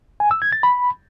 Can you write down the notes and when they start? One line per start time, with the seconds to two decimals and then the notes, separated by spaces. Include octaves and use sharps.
0.20 G#5
0.31 E6
0.42 G#6
0.52 A6
0.63 B5